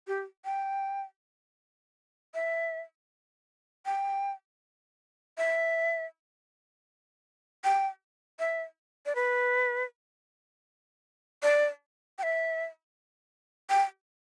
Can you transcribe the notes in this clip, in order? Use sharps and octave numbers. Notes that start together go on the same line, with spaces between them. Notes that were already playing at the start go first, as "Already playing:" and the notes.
G4
G5
E5
G5
E5
G5
E5
D5
B4
D5
G5
E5
G5